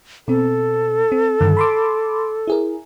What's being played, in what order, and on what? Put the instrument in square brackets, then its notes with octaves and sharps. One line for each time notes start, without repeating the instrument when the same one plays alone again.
[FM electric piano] B2 C4 [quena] A4
[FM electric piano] C4
G2 D3 D#3
B5 C6 D6
E4 G#4 A#4